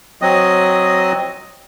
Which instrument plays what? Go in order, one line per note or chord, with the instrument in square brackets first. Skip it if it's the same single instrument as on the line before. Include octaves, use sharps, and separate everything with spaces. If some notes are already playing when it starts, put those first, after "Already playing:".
[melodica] F#3 C4 D#5 D#6